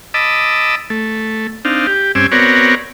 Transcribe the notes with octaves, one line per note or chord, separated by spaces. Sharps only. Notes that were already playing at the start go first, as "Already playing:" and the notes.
D#5 A5 B5 D6 E6
A3
C4 D4 D#4 F5
G4
G2 C4 C#4 G#5 D6 E6
B3 C4 F#4 A#4 C#5 D5